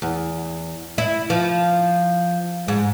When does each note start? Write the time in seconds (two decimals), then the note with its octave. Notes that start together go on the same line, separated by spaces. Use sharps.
0.02 E2
0.98 E4
1.30 F3
2.68 G#2